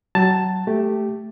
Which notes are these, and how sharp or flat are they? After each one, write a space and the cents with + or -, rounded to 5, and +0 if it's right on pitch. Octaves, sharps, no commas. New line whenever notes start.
F#3 +25 A5 +5
A3 +0 G4 +0